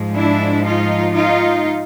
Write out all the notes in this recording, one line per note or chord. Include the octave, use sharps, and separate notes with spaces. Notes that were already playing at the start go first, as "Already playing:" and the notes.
Already playing: G#2 F3 G#3
D4 E4
D#4 F4
D#4 F4